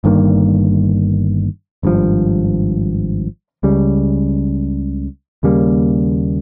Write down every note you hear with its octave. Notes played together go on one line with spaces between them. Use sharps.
G1 G2 D#3 A#3
G#1 G2 F3
C#2 C#3 G3
D#2 C#3 G3 A#3